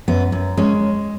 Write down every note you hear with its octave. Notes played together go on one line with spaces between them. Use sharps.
F#2 B3
F#2
G#3 C#4